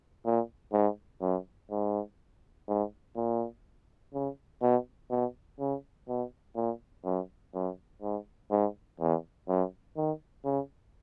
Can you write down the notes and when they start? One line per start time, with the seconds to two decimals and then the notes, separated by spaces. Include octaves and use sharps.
0.25 A#2
0.73 G#2
1.21 F#2
1.71 G#2
2.68 G#2
3.16 A#2
4.14 C#3
4.62 B2
5.10 B2
5.60 C#3
6.08 B2
6.56 A#2
7.05 F#2
7.54 F#2
8.02 G#2
8.51 G#2
9.00 E2
9.48 F#2
9.97 D#3
10.45 C#3